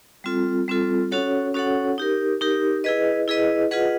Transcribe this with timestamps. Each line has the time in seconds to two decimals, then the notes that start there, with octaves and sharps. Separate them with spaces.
0.24 G3 C4 F4 A4
0.68 G3 C4 F4 A4
1.11 C#4 F#4 A4 C#5 F#5
1.54 C#4 F#4 A4 C#5 F#5
1.98 D#4 G4 A#4
2.41 D#4 G4 A#4
2.84 E4 G#4 B4 D#5
3.28 E4 G#4 B4 D#5
3.71 F4 G#4 B4 D#5 F#5